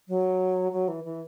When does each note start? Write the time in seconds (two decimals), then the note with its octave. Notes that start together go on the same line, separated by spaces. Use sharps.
0.08 F#3
0.72 F#3
0.88 E3
1.04 E3